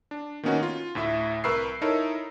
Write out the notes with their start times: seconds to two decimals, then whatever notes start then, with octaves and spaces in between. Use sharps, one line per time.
0.11 D4
0.43 D#3 A#3 B3 C#4 D#4 F#4
0.63 F4
0.95 D2 A2 E4 E5
1.44 C2 A#4 B4 C#6 E6 C7
1.81 D#4 E4 A4 A#4 C#5